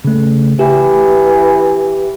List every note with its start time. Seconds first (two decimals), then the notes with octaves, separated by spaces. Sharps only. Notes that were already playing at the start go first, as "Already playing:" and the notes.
0.05 C#3 A3
0.59 E3 G4